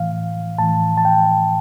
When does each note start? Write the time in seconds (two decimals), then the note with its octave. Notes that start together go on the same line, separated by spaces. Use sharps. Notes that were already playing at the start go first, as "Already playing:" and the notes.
Already playing: A2 E3 F5
0.58 A2 E3 A5
0.97 A5
1.05 G5